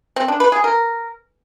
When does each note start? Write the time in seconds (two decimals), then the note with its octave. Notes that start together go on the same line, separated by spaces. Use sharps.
0.16 C4
0.28 D4
0.40 B4
0.52 G#4
0.64 A#4